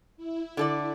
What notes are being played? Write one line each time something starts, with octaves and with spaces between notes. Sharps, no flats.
E4
D3 A4 D5